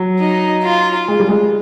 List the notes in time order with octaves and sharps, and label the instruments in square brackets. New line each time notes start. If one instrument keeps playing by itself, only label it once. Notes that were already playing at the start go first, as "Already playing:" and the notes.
Already playing: [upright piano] F#3
[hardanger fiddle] D#4
F4
[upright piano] G#3
G3
G#3